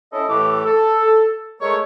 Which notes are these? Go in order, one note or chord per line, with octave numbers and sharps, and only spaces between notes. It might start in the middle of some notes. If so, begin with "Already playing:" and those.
C#4 E4 A4 D#5
A2 E3 A3 G4 D6
A4
G#3 A3 A#4 C#5